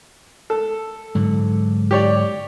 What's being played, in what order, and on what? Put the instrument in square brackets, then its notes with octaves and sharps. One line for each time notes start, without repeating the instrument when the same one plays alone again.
[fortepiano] A4
[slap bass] G#2 D3 F#3
[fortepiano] G4 C#5 D5